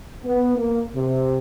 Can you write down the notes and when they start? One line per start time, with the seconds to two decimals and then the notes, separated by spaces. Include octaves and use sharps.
0.24 B3
0.56 A#3
0.95 C3